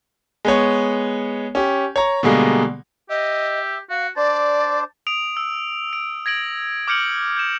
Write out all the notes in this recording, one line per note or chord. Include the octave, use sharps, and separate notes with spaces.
G#3 B3 C#5
C#4 G4
C#5 A#5
B2 D3 G3 G#3 A#3
G4 D#5 E5
F#4 F5
D4 C5 D5 A5
D#6 D7 F7
E6
D7
G#6 A#6 D7 F#7
D6 F6 G6 C#7 D7 F#7
G6 E7